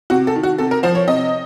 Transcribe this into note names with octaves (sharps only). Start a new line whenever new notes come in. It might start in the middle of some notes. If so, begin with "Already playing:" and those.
C3 F#4
A4
D#3
F#4
C3 A4
A#4
F3 C5
C#5
C3 D#5